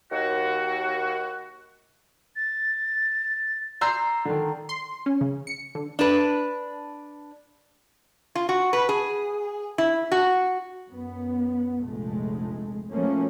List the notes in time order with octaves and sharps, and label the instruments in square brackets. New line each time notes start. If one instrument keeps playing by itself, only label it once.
[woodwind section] D#2 F#4
[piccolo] A6
[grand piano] D5 E6 G6 [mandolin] A#5 C6
[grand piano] D3 D#3
[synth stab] C6
C#4
C#3
C#7
D3
[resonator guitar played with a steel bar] D4 B4
F4
F#4
B4
G#4
E4
F#4
[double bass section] F#2 B3
F1 A#1 G#3 A3
F3 F#3 A3 A#3 C#4